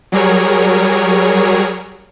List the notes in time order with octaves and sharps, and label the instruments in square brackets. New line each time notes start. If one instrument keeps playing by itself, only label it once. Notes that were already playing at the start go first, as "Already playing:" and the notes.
[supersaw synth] F#3 G3 G#4 A#4 C#5